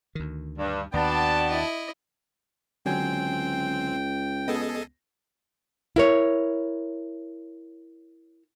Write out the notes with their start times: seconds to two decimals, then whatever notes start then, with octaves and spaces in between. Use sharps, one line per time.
0.15 D2 D#3
0.59 G2
0.94 D#2 B3 D4 F#4 D5 G5 A5
1.50 E4 D#5
2.86 C#2 D3 F#3 C4 G5 G#5
4.48 B3 G#4 A4 D#5
5.96 E4 A#4 C#5